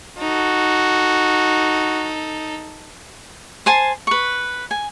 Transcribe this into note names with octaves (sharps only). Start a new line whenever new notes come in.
D#4 F#4 A4
C5 G#5 A5 C6
B4 C#6
G#5